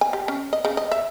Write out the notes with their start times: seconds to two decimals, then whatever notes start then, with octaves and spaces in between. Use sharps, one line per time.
0.01 G#5
0.13 G4
0.28 C#4
0.53 D#5
0.65 C#3
0.77 D#5
0.92 E5